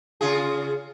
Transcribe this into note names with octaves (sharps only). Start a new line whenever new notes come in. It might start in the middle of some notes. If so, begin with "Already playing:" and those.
C#3 F4 G#4